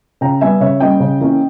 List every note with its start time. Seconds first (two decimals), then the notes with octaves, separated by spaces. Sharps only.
0.21 C#3 G5 A#5
0.41 G3 B3 E5 G#5
0.61 C#3 C#5 E5
0.80 G3 A#3 C#4 D#5 G5
1.00 C#3
1.20 E3 A#3 C#4